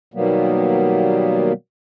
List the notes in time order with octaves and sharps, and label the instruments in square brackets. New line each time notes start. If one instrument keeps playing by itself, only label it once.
[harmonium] B2 D#3 F#3 G3 A#3 B3